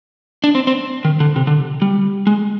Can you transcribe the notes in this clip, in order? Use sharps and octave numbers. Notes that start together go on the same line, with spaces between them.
D4
C4
C4
D#3
D3
C3
D3
G3
G#3